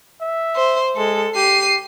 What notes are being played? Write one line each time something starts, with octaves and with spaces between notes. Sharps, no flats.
E5
C5
G#3 A4
G4 C7 D#7